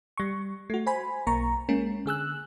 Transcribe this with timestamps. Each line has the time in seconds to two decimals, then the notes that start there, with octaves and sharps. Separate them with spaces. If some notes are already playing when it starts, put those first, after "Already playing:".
0.18 G3 C#6
0.70 A3 F#4
0.86 C5 G#5 B5
1.26 B1 A#3 A#5 C#6
1.69 G#3 A#3 C#4
2.06 D3 G#4 E6 F#6